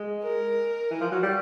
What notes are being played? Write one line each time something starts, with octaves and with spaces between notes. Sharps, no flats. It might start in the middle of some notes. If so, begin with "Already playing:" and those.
Already playing: G#3
A#4
E3
F3
F#3
G3